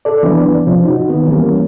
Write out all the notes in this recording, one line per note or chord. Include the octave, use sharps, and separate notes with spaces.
A4 D5
E3 F#3 B3 D4 B4 D5
C3 F3 C#4
D#4 F#4
D#3 B3
E3 G3 A#3 C#4